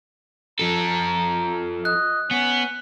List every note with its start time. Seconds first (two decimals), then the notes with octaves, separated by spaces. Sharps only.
0.59 F3 A4 A#5
1.85 D#5 F#6
2.31 B3 C#4